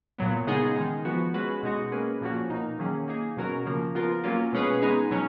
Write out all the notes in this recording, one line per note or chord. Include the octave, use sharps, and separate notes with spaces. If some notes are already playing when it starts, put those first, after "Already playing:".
A#2 F#3 B3
C#3 G#3 B3 D#4 G#4
D#3 G#3 D#4
F3 B3 F#4
G#3 C#4 F#4 B4
B2 G#3 D#4 F#4
A#3 C#4 G#4 B4
A#2 F3 A#3 C#4 F#4
B2 A#3 D#4
D#3 F#3 A#3 C#4 G#4
A#3 D#4 G#4
B2 F#3 C#4 F#4 A#4
C#3 F3 A#3
F3 B3 F4 A#4
F#3 A#3 C#4 F4
B2 G#3 C#4 G#4 B4
G#3 B3 D#4 G#4
B2 F#3 C#4